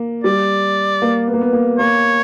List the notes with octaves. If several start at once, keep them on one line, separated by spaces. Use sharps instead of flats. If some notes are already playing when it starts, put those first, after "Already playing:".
Already playing: A#3
G3 D5
A#3
B3
A#3
B3
A#3
A#3 C#5